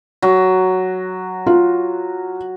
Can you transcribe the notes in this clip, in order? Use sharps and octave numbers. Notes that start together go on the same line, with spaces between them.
F#3
F4